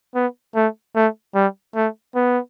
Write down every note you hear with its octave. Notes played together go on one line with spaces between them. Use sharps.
B3
A3
A3
G3
A3
B3